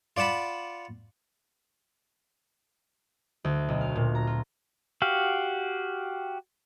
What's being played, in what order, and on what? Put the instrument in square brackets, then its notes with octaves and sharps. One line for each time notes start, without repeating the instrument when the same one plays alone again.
[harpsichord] F4 D5 F#5 A5 B5
[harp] D2
B1
F5
A#2
A#5
F4
[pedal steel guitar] F#4 G4 F5